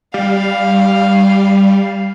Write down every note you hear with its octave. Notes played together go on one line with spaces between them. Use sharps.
G3 F5